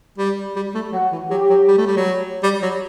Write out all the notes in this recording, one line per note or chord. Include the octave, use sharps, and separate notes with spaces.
G3
G3
A3
F#3 F#4
E3
F#3 G4
F#3
G3
A3
G3
F#3
G3
F#3